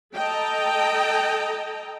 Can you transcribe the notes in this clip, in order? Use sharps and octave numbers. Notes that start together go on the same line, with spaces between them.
A4 D#5 G5 A5 A#5